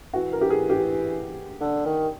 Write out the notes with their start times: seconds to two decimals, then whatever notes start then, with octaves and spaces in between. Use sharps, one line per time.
0.14 E3 F#4
0.33 A#4
0.41 G4
0.50 G#4
0.70 G4
1.60 D3
1.86 D#3